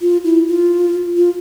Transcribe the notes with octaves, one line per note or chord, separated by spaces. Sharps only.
F4
E4
F4
F4